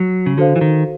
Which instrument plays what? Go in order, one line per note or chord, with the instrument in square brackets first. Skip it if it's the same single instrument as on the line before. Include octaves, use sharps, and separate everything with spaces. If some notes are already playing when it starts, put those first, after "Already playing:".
Already playing: [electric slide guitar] F#3
C#3
[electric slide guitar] D3 [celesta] F#4 A4 C5 F5
[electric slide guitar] E3
D#3